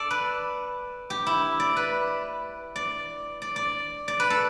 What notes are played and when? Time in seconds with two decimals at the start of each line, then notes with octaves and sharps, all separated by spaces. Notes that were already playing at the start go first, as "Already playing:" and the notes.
Already playing: A4 D5
0.11 B4
1.10 G4
1.27 E4
1.60 D5
1.77 B4
2.76 D5
3.42 D5
3.56 D5
4.08 D5
4.20 B4
4.30 A4